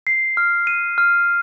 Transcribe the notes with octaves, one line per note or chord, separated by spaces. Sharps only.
C7
F6
D#7
F6